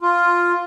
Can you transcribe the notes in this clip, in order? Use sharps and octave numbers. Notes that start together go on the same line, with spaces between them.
F4